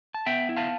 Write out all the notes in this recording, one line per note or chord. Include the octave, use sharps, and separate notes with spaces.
A5
B3 E5 G5
E4
F5 A5